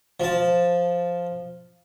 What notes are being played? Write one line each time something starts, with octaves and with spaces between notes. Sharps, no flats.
F3 A5